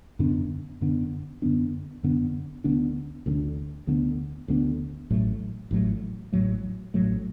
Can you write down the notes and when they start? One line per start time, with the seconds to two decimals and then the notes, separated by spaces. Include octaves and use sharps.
0.19 F#2 D3 B3 D4
0.81 F#2 D3 B3 D4
1.42 F#2 D3 B3 D4
2.03 F#2 D3 B3 D4
2.64 D2 D3 B3 D4
3.26 D2 D3 B3 D4
3.87 D2 D3 B3 D4
4.48 D2 D3 B3 D4
5.10 A1 A2 F#3 A3
5.71 A1 A2 F#3 A3
6.33 A1 A2 F#3 A3
6.94 A1 A2 F#3 A3